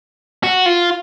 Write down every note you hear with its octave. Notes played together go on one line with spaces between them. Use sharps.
F#4
F4